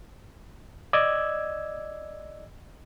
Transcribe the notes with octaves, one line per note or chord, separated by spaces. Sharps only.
D5 D#5 E6 G#6